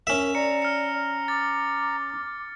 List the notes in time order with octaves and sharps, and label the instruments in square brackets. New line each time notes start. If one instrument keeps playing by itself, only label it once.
[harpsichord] C#4 E5 [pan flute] A#4
[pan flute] D5 [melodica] A#5 [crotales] C#7
[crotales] F6 C#7
[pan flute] D6 [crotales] A6